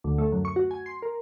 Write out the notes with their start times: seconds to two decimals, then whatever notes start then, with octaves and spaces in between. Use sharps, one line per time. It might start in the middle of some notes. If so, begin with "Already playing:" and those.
0.04 D2
0.18 A3
0.32 F#2
0.45 C#6
0.56 F#4
0.71 G#5
0.86 C6
1.02 A#4